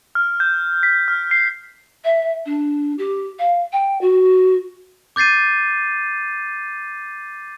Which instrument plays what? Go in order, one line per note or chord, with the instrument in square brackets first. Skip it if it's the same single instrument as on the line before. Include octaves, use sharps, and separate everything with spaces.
[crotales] F6
G6
B6
F6
C7
[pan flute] E5
D4
G4
F5
G5
F#4
[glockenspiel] D6 G6 A6 C7 D#7